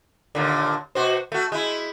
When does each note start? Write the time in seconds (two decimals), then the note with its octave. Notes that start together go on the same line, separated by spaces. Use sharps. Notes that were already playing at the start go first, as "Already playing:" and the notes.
0.35 D#2 A#2 D3
0.95 B2 F#4 C5
1.32 A3 F#4
1.52 G#3 E4